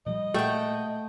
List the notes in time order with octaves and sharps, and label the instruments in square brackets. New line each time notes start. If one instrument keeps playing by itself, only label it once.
[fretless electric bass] A#2 F3 G3 [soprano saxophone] D#5
[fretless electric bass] A#2 [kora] A3 [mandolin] F#5 G5